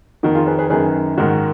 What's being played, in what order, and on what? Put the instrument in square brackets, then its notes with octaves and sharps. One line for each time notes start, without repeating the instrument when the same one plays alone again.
[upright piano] F2 D#3 D#4 F#4
F4 G#4
G#4 B4
G#4 B4
F#2 D#3 G#4 B4
G#2 D#3 F#4 A#4